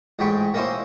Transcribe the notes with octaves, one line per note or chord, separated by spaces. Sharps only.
A1 G#2 G#3 G5 B5 C#6
A#3 C#4 D#4 E4 A#4 C5